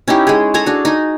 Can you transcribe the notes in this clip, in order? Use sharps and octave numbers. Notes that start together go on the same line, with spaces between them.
C#4 D#4 E4 G4
G#3 G#4
G#4 A4 G#5 A#5
D4 F#4
D#4 G#5